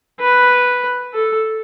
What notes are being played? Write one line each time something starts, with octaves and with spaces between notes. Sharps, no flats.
B4
A4